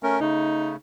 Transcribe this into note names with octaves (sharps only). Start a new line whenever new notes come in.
A3 C#4 A#4
C#3 A3 D#4